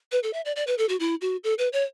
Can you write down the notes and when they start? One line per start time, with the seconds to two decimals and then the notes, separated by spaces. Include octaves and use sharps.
0.12 B4
0.23 A4
0.33 E5
0.45 D5
0.56 D5
0.67 B4
0.78 A4
0.89 F#4
1.00 E4
1.21 F#4
1.44 A4
1.58 B4
1.73 C#5